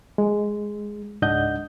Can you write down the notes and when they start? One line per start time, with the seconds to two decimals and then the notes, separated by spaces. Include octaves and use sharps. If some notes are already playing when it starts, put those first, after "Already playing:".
0.18 G#3
1.22 C#2 G#2 D4 D#5 F#5 G6